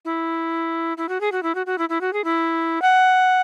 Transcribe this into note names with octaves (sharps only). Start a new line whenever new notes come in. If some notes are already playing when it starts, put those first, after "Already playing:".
E4
E4
F#4
G#4
F#4
E4
F#4
F#4
E4
E4
F#4
G#4
E4
F#5